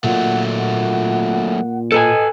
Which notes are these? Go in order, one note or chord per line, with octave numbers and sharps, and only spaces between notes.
A#2 F#3 A3 F#5
F#5
A4 B4 D#5 G#5